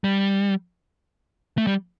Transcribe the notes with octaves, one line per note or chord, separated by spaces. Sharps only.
G3
A3
G3